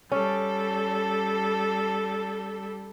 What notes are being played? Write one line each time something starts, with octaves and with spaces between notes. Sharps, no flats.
G3 C#4 A4